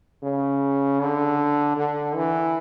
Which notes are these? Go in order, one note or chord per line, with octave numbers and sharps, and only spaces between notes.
C#3
D3
D3
E3